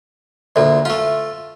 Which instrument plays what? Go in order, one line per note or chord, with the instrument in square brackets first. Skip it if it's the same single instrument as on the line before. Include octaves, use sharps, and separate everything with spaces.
[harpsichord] D2 A#2 [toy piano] A4 E5
[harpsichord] A3 F4 [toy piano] F5